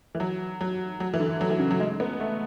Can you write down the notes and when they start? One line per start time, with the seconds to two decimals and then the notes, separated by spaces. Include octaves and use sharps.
0.15 E3
0.20 F#3
0.61 F#3
1.00 F#3
1.14 E3
1.20 D3
1.41 F#3
1.50 E3
1.60 C#3
1.71 F#3
1.80 G#3
2.00 B3
2.20 A3